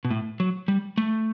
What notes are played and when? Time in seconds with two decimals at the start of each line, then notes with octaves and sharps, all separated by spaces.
0.05 B2
0.11 A2
0.40 F#3
0.68 G3
0.98 A3